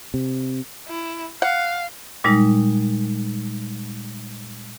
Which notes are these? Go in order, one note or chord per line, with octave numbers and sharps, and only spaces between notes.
C3
E4
F5 F#5
A#2 G3 G#3 D#4